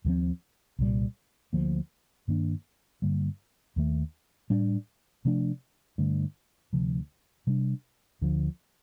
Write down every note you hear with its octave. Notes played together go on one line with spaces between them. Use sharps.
D#2 D3 F3 C4
C2 A#2 G3
D2 D3 F3 A#3
G2 D#3 A#3 D4
G2 D3 G3 A#3
D#2 D#3 A3
A2 G3 D4
C3 F3 A3 D4
G2 D3 A3
D2 C3 F3
C3 G3 D4
D2 D3 F3